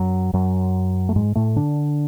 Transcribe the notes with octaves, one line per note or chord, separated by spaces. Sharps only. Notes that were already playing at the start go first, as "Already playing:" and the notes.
Already playing: F#2 F#3
F#2 F#3
A3
G#2 G#3
A2 A3
D3 D4